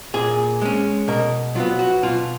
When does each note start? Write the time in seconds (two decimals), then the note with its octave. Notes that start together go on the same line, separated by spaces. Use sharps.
0.14 A#2 G#4
0.61 G#3 C#4
1.08 B2 A#4
1.55 F#3 B3 F4
1.79 F#4
2.03 B2 F4